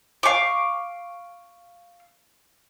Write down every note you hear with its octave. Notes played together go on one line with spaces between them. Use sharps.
F5 G5 C#6 D6